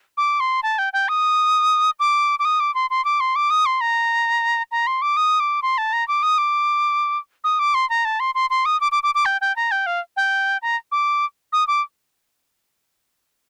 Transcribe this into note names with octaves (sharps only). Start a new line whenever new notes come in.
D6
C6
A5
G5
G5
D#6
D6
D6
D#6
D6
C6
C6
D6
C6
D6
D#6
C6
A#5
A#5
C6
D6
D#6
D6
C6
A5
A#5
D6
D#6
D6
D#6
D6
C6
A#5
A5
C6
C6
C6
D#6
D6
D6
D6
D6
G5
G5
A#5
G5
F5
G5
A#5
D6
D#6
D6